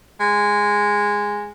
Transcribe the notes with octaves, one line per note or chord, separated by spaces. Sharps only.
G#3